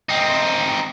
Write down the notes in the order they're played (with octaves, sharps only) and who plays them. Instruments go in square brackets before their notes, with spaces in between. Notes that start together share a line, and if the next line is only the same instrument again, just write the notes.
[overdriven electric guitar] C4 D#4